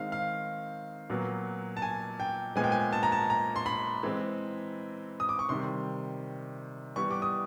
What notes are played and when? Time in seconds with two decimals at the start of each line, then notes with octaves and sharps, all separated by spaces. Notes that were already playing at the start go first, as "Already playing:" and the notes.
Already playing: D#3 G#3 C4 F5
0.12 F5
1.10 A#2 F#3 B3
1.77 A5
1.82 G#5
2.20 G5
2.56 A#2 F3 G#3 B3 G#5
2.64 G5
2.72 G#5
2.93 A5
3.03 A#5
3.12 A5
3.30 A#5
3.56 C6
3.66 B5
4.03 E3 G#3 C4
5.20 D#6
5.29 D6
5.39 C#6
5.49 C3 D#3 G3 C6
6.96 E3 G3 B3 C#6
7.11 D6
7.22 D#6